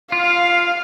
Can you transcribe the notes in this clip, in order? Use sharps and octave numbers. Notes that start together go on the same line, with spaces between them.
F4 F5